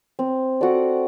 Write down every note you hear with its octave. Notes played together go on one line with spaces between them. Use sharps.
C4
F#4 A4 D5